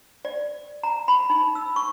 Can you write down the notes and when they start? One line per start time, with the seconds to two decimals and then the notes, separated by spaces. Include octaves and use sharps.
0.25 D5
0.83 A#5
1.08 B5
1.30 D#4
1.55 E6
1.76 C#6